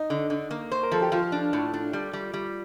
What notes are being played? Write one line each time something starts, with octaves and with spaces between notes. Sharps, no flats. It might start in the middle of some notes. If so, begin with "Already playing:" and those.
Already playing: D#4
D3
D3
A#3
C5
A#4
F3 A4
G4
F3 F4
D4
A2
D4
G3
G3
G3